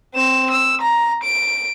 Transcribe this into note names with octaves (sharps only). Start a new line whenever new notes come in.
C4 E7
E6
A#5
D7